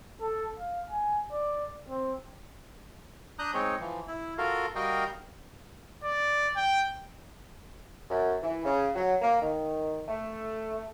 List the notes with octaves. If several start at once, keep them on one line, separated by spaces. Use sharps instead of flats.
A4
F5
G#5
D5
C4
D4 A#5 D#6 F#6 G6
G#3 C4 D#4 C#5
E3 F3
E4
F4 F#4 A4 A#4 F5
G3 F#4 A#4 D#5 F5 G5
D5
G5
F#2
E3
C#3
F#3
A#3
D#3
A3